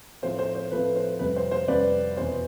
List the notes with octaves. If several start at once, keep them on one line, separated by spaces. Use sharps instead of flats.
A2 F3 A3 C4 C5
C5
C5
A2 F3 A3 C4 B4
C5
F2 C3 G3 B4
C5
C5
F2 C3 G3 B4 D5
E2 B2 B3 C5